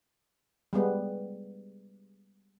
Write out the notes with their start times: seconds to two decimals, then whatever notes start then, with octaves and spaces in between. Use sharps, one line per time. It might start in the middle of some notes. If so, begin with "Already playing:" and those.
0.73 G3 G#3 B3